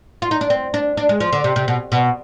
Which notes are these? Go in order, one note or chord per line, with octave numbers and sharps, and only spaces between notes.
F4
D#4
D4
C4
D4
D4
G#3
F3
D3
C3
C3
B2
B2